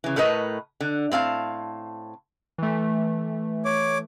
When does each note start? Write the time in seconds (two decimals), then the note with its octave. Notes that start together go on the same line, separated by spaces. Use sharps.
0.04 C#3 E3
0.16 A2 A3 A#4 B4 D#5
0.81 D3
1.12 A2 C4 F5 A5
2.58 E3 A3
3.65 C#5 D6